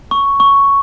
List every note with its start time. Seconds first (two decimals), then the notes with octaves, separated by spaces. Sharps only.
0.11 C#6
0.40 C#6